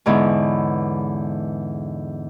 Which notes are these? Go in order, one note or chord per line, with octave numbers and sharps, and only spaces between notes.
E2 G#2 D3 B3 E4 C#5